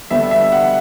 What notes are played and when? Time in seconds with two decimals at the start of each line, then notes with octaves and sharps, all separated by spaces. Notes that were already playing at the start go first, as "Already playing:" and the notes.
0.10 D3 G3 B3 E5
0.31 E5
0.52 F#5